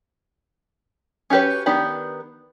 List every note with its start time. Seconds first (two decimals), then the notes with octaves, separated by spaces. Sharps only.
1.30 C#4 F#4 G4 B4 C#5
1.66 D#3 B3 D4 G4 B5